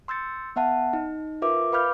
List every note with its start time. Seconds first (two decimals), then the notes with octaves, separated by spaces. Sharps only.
0.08 C6 E6 G6 A6 C#7
0.56 B3 E5 F#5 A5
0.93 D#4
1.42 F4 A#4 B4 E5 D6
1.72 B4 F5 B5 D6 F6 G6